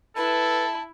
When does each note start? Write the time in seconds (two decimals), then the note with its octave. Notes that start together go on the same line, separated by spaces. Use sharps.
0.16 E4 A4 B4 A5